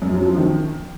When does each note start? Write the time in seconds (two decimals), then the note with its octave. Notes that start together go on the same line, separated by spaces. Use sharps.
0.02 F#2
0.13 F#3
0.25 F3
0.37 D#3